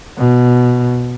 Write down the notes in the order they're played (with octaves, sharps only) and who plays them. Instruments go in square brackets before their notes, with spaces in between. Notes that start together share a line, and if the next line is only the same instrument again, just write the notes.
[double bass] B2